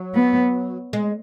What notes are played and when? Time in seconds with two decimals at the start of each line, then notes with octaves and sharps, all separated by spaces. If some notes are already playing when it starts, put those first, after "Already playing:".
Already playing: F#3
0.14 B3
0.93 G#3